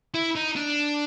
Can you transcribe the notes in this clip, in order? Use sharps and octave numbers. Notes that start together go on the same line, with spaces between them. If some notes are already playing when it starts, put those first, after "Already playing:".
E4
D#4
D4